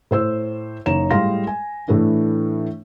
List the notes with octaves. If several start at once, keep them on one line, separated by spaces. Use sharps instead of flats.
A2 C5 E6
F#1 D#4 C#5 A#5 E7
A2 G3 G#3 F5 C6 A#6
G#5
A2 E3 A3 D4 E4